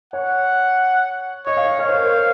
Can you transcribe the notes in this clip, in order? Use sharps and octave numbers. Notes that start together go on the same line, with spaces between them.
C#5 F#5
C#5 D#5
F5
D#5
C#5 F5
C5
A#4
C5